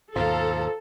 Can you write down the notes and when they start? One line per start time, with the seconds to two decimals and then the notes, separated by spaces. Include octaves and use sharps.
0.16 D#2 G#2 B2 F3 A4 F5 A#5